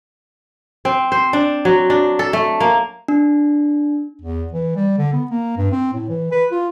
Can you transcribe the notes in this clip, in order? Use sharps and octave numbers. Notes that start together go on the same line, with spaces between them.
C4
C5
D4
F#3
D4
A4
A3
A#3
D4
E2
E3
G3
D3
B3
A#3
G2
C4
A2
E3
B4
F4